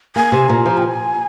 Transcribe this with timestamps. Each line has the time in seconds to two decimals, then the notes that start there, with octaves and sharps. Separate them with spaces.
0.16 A#3 G#5
0.32 C3
0.49 A#2 A#5
0.66 F3
0.78 G5
0.83 G#5